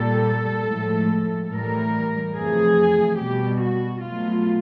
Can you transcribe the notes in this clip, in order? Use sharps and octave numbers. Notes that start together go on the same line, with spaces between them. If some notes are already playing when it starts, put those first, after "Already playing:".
Already playing: A#2 G3 A4
A2 F3 G#3
A2 E3 G3 A#4
F2 C3 E3 A3 G#4
B2 G3 G4
F#4
B2 F#3 A3 F4